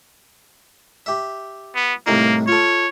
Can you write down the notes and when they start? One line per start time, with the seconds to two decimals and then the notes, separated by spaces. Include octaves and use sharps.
1.06 G4 E5
1.75 B3
2.07 C2 A2 A#3 D#4
2.48 F4 A4 C#5